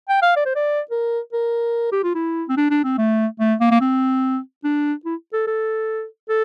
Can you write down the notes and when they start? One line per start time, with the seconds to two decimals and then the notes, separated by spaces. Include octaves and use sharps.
0.09 G5
0.22 F5
0.36 D5
0.45 C5
0.55 D5
0.91 A#4
1.33 A#4
1.92 G4
2.03 F4
2.15 E4
2.49 C4
2.57 D4
2.70 D4
2.84 C4
2.98 A3
3.40 A3
3.60 A#3
3.71 A#3
3.81 C4
4.64 D4
5.05 E4
5.33 A4
5.47 A4
6.29 A4